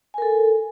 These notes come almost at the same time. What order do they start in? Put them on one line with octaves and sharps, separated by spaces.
G#5 A#4 A4